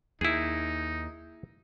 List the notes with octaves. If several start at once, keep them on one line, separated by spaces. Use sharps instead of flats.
D#2 D#4 E4 G#4